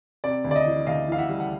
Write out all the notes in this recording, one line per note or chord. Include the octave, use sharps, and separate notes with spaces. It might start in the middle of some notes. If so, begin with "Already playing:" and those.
C3 D5
D2
D5
D#5
E3
D2 D#5 F5
E3 F5
E5 F#5
G3
F#5